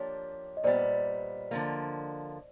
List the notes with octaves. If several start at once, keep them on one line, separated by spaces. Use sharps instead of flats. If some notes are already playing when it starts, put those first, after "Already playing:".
Already playing: F3 A#3 D4 G4 C#5
D#5
A#2 G3 B3 C5 D5
D3 F3 A#3